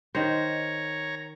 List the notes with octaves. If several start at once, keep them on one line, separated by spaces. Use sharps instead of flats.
D#3 C5 C#5 A#5